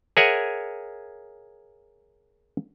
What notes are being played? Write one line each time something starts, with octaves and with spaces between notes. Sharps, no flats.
G#4 A#4 C#5 E5 F#5 G#5